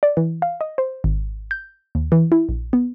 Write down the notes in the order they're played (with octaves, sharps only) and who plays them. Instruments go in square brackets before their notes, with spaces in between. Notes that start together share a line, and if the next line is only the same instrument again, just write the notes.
[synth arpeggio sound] D5
E3
F5
D#5
C5
G#1
G6
D#2
E3
E4
A#1
B3